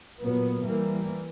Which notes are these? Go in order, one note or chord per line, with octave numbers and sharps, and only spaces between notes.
A#2 F#3 B3
E3 G3 A#3